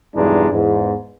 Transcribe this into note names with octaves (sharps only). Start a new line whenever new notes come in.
B1 E2 G2 G#3 D4 D#4
E2 G#2